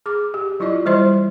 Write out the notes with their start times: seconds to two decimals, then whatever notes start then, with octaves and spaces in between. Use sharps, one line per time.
0.06 G#4 D6
0.34 G4
0.60 F#3 E4 F4 D5 D#5
0.85 E3 G3 E4 C5 D#5 C6